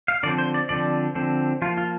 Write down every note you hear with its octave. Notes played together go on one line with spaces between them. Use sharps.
F5
D3 F3 C4 D5
C5
D5
D3 F3 C4 D5
D3 F3 C4
F3 A#3 F4
F4